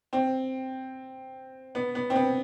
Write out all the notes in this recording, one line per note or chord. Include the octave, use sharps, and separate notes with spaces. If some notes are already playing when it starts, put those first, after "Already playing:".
C4
B3
B3
C4
B3